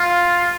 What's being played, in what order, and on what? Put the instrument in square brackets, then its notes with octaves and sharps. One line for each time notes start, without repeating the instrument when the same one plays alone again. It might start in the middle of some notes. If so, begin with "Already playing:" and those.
Already playing: [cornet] F4